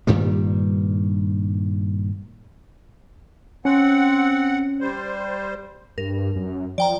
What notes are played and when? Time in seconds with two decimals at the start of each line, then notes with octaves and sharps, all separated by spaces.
0.07 G2 A#2 D#3 G3
3.65 C4 C#4 F#5
4.81 G3 C5
5.98 G2 A#4
6.36 F#2
6.78 F3 D5 G5 A#5